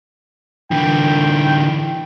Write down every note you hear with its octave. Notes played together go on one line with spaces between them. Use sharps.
D3 E3 G5